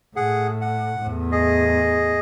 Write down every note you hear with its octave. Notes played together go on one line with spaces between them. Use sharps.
A2 G#4 F#5
F#5
E2 A2
G#4 D#5